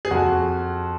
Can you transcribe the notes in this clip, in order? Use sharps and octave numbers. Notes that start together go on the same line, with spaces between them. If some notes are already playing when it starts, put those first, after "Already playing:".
G#4
F2 F#4